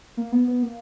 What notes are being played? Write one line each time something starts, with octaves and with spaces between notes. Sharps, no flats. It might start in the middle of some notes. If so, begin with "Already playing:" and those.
A#3
B3
B3
A#3